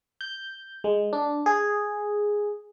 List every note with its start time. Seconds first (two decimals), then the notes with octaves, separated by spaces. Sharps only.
0.21 G6
0.84 G#3
1.13 D4
1.46 G#4